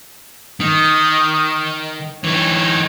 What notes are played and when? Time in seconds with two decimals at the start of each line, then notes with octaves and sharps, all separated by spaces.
0.61 D#3 D#6
2.24 E3 D#4 C#5